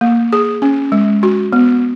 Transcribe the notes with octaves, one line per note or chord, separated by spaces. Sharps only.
A#3
G#4
C#4
G#3
F#4
B3